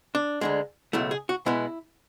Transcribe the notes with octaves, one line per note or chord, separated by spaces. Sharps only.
D4
D2 D3 G#3
C#2 B2 F#3 A3 E4
G#4
F#4
B2 G#3 B3 E4